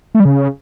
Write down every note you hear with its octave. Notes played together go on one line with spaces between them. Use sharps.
A3
G3
C#3